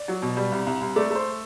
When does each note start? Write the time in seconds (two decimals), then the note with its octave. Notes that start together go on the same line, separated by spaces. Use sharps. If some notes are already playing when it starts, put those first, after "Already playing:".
Already playing: D5
0.08 F#3
0.22 B2
0.37 G3
0.52 C2
0.67 C2
0.81 C2
0.96 A3 D5
1.11 A3 C5